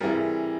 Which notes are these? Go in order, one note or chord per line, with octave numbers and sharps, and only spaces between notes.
C3 E3 G3 G#4 A#4